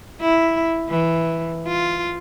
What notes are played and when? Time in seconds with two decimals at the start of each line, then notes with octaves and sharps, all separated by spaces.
0.21 E4
0.88 E3
1.67 F4